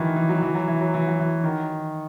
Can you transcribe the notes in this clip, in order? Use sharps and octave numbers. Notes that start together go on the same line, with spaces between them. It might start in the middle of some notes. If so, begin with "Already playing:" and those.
Already playing: D#3 E3 F#3
E3
F#3
E3
F#3
E3
F#3
E3
F#3
E3
D#3